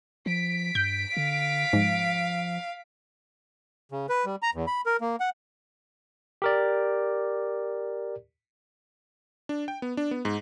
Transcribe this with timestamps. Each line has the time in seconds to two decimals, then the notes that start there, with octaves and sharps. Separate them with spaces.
0.26 F3 B6 D7
0.75 G2 G6
1.17 D3 F5
1.73 G#2 F3
3.92 C#3
4.09 B4
4.25 G3
4.42 A#5
4.54 E2
4.67 B5
4.86 A#4
5.01 A#3
5.20 F#5
6.42 G4 A#4 D5
9.49 D4
9.68 G5
9.82 B3
9.97 D4
10.11 B3
10.25 G#2